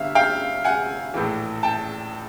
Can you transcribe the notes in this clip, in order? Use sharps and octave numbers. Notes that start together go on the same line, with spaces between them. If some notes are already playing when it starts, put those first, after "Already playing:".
Already playing: G1 D3 G3 E5 F5
F5 G5
F#5 G#5
A#1 A2 E3
G5 A5